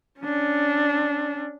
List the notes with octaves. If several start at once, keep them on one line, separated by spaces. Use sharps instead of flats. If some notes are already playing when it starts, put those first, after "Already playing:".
C#4 D4